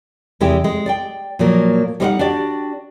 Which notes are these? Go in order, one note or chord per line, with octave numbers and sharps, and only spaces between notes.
E2 C3 G#3 E4 G4
G#3
D5 F#5 G5
A#2 F3 F#3 A#3
G3 D#4 B4 D5 F5 F#5
D4 F#4 G4 D5